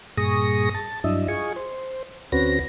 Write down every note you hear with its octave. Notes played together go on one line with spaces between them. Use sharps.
G2 A#2 G#4 C#6 D#6 A#6
A5
G2 F#3 D4 E4 D#5 E5
F4 G#4 D#5 G#5 C#6
C5
D2 C4 C#4 F#4 B4 A#6